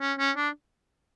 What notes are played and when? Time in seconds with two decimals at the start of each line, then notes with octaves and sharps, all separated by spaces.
0.01 C#4
0.18 C#4
0.36 D4